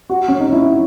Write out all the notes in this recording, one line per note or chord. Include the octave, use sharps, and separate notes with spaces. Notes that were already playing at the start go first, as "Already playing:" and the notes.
F#4
C#4
D#4
E4